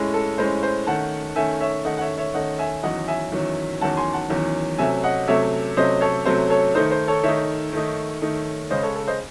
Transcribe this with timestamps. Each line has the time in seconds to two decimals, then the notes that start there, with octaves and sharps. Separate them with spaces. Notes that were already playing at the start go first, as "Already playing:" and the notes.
Already playing: A2 G#3 C#4
0.14 A4
0.38 A2 G#3 C#4 C5
0.63 C5
0.87 D#3 A3 C#4 F#5 A5
1.36 D#3 A3 C#4 E5 G#5
1.61 C#5 E5
1.85 D#3 A3 C#4 D#5 F#5
1.98 F#5
2.01 C#5 E5
2.17 C#5 E5
2.34 D#3 A3 C#4 D#5 F#5
2.59 E5 G#5
2.83 E2 D#3 F#3 C#4 D#5 F#5
3.08 E5 G#5
3.32 E2 D#3 F#3 C#4
3.81 E2 D#3 F#3 C#4 F#5 A5
3.97 G#5 C6
4.13 F#5 A5
4.29 E2 D#3 F#3 C#4
4.78 C3 F#3 A3 C#4 E5 G#5
5.03 D#5 F#5
5.28 C3 F#3 A3 C#4 C#5 E5
5.77 C3 F#3 A3 C#4 C5 D#5
6.01 A4 C#5
6.26 C3 F#3 A3 C#4 C5
6.50 A4 C#5
6.75 D#3 A3 D#4 C5
6.91 C5
7.08 A4 C#5
7.23 D#3 A3 D#4 C#5 E5
7.73 D#3 A3 D#4
8.22 D#3 A3 D#4
8.71 C#3 G#3 C#4 C5 D#5
8.83 A4 C#5
8.95 A4
9.08 C5 D#5